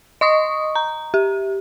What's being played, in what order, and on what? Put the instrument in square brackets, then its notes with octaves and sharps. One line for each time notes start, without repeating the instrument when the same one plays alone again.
[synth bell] D#5 C#6 D#6
A#5
G4